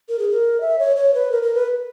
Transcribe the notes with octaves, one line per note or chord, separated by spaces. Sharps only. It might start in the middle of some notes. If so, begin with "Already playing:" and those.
A#4
G#4
A#4
E5
C#5
C#5
B4
A#4
A#4
B4